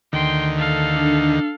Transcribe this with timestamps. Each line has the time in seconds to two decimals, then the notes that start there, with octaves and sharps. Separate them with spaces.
0.13 D2 D#3 G5 C6
0.58 A4 F5
0.96 D4